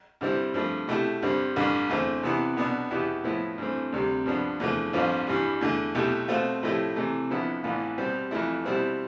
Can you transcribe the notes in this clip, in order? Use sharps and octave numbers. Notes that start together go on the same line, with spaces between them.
G2 D3 G3 C4 E4
G2 F3 A3
B2 A3 E4 G4
G2 D3 G3 C4
A1 G2 D3
E2 D3 A3 C4
C3 E3 B3 E4
B1 B2 B3 D4
E2 B2 B3 E4 G4
A2 F3 B3 E4
G2 E3 A3 C4
D2 C3 G3
G2 F3 B3 D4
E2 D3 F3 A3
A1 G2 F3 C4 F4
G2 E3 G3
E2 D3 A3
B1 B2 A3 E4 G4
B2 A3 C4 F4
A2 F3 A3 E4 G4
C3 E3 A3
F2 D3 F3 B3 E4
A1 A2 E3 B3 F4
B2 G3 C4 G4
F2 E3 A3 E4
B2 G3 C4 E4